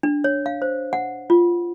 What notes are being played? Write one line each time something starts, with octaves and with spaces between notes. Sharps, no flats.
D4
C#5
F5
C5
F#5
F4